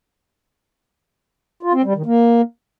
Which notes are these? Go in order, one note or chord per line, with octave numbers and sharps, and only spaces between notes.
F4
C4
G3
D#3
A#3